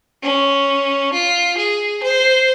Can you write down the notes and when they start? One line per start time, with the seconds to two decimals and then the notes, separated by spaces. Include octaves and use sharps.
0.23 C#4
1.13 F4
1.57 G#4
2.03 C5